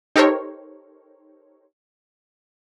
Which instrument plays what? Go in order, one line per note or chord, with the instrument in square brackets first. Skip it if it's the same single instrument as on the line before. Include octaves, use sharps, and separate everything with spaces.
[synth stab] D#4 G4 A4 A#4 C5 C#5